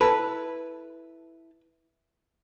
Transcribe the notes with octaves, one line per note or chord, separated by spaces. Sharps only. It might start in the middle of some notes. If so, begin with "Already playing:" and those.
E4 A4 B4 A5